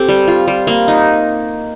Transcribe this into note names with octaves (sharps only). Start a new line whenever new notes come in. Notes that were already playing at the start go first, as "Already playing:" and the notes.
Already playing: C4 G4 A4
G3
F4
G3
A#3
D#4